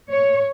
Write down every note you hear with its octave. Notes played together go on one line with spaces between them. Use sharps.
C#5